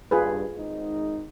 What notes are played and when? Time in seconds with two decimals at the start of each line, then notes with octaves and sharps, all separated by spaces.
0.11 G2 F4 G#4 B4
0.57 G#1 G#2 D#4